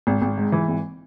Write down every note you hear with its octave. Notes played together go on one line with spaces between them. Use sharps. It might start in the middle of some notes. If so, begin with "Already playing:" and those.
G#1
G#1
G#2
E3
G#1